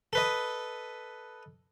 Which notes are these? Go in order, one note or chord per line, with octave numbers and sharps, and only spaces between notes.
A4 B4 D#5